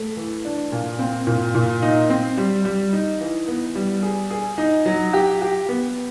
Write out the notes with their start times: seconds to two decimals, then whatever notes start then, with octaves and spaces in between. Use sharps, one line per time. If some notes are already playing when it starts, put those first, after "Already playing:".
Already playing: A3
0.17 E3
0.45 D4
0.72 A#2
0.99 C4
1.27 A#2
1.55 A#2
1.82 D#4
2.10 C4
2.37 G3
2.65 G3
2.93 D#4
3.21 E3
3.48 B3
3.75 G3
4.02 G#4
4.30 G#4
4.58 D#4
4.86 F#3
5.13 G4
5.41 G4
5.69 B3